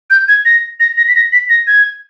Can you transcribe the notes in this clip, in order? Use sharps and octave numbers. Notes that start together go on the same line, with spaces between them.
G6
G#6
A#6
A#6
A#6
B6
A#6
B6
A#6
G#6